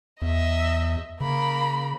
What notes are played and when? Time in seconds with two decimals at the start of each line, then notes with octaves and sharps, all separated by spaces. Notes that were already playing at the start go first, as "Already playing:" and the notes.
0.22 E2 D#5 E5
1.21 C#3 A#3 B5